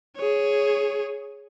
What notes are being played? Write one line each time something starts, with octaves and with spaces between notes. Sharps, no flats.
G#4 C#5